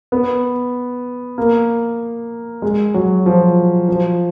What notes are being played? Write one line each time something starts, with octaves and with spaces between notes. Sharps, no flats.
B3
A#3
G#3
F#3
F3
F3